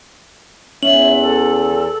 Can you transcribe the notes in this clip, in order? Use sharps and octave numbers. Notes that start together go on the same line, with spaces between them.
E2 C#4 E5 F#7
A4